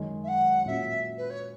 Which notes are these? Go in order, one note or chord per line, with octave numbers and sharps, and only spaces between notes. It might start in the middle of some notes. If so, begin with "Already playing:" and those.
Already playing: F#2 D#3 G#3 D#4
E5
F#5
A#2 F#3 C#4 E5
B4
C#5